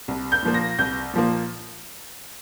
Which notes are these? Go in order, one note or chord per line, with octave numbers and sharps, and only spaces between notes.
C2
G6
A#2 F3 A#3
A#6
C2 G6
A#2 F3 A#3